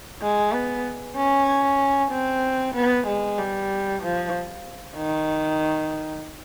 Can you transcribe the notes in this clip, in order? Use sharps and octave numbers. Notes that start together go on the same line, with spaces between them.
G#3
B3
C#4
C4
B3
G#3
G3
F3
D#3